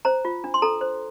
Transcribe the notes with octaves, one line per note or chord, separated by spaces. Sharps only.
C5 A#5
F4
D4
C6
A4 A#5
C5